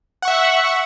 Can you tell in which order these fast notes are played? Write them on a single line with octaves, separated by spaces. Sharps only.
F#5 C#6 E5